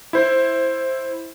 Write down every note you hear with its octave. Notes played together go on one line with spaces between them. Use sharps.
E4 C5